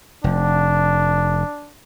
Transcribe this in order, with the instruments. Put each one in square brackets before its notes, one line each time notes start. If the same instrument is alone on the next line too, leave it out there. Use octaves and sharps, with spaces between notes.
[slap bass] F1 [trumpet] D4